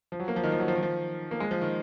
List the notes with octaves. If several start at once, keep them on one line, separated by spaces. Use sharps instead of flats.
F3
F#3
A#3
F3
D#3
F3
F#3
F3
D#3
F3
A#3
G#3
F3
D#3